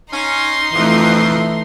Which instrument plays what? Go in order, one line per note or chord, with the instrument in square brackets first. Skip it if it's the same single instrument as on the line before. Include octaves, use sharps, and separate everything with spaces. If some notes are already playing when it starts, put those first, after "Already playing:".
[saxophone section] C#4 [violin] D#4 C6
[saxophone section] F2 [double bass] E3 A3